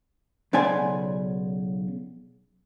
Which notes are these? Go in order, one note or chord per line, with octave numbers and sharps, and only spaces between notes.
B1 C#3 B3 D5 G#5 C6